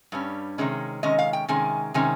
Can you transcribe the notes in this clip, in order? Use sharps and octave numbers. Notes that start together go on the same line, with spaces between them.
G2 G3 C#4
C3 D#3 G#3 C#4
C3 D#3 G#3 C#4 D#5
F5
G5
C3 D#3 G#3 C#4 G#5
C3 D#3 G#3 C#4 G#5